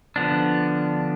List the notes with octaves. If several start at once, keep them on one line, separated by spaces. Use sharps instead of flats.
D3 F3 B3 D4